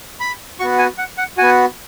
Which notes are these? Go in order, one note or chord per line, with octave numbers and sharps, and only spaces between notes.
B5
B3 F#4 C#6
G#5
F#5
F#5
B3 F#4 G#5